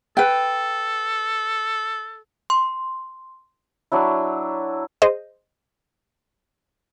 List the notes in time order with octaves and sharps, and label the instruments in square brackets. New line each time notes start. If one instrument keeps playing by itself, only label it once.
[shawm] A4 [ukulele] B4 G5
[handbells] C6
[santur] F#3 D4 E4
[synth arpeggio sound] G#4 C5 D#5